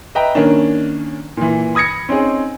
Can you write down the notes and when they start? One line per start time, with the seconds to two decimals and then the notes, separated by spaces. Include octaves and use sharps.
0.15 B4 D#5 E5 G5 A#5
0.35 D#3 A#3 C#4 D4
1.37 A#2 E3
1.75 B5 D#6 G#6 A#6 C#7
2.09 C4 C#4 D#4 G#4